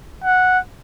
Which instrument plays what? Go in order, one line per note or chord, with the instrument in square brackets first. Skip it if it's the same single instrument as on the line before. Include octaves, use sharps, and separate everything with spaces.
[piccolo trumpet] F#5